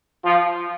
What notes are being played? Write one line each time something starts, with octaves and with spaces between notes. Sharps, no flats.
F3